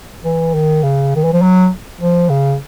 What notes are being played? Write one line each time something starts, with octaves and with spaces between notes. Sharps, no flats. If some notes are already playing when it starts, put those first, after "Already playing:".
E3
D#3
C#3
D#3
E3
F3
F#3
F3
C#3